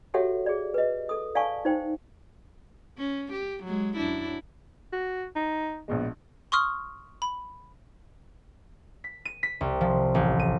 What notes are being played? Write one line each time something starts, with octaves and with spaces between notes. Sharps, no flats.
F#4 G4 A4 C#5 E5 F#5
G#4 D5
B4 D#5
A4 D#6
D5 F5 G#5 A5 C#6
D#4 C5 G5
C#4
G4
F#3 G#3
F#2 D4 E4
F#4
D#4
A#1 B2 G#3
C6 C#6 D#6 F6
B5
B6
D#7
B6
C2
F3
A1
D#7